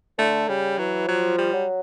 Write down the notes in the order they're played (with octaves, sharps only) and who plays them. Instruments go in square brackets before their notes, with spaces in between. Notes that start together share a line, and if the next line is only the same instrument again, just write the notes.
[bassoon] D3 [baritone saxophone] A3
[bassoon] C#3 [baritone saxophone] G3
[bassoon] E3 [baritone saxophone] F#3
[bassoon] F3 [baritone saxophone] F#3
[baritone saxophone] G3
[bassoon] F#3